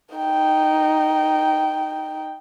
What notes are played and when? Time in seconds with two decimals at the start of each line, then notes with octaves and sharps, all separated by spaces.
0.15 D#4 G5